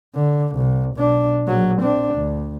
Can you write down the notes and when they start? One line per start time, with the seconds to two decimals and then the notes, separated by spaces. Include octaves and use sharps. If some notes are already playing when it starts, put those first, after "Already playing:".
0.15 D3
0.56 C2
0.96 B1 D4
1.47 A#1 F#3
1.82 C4 D4
2.15 D2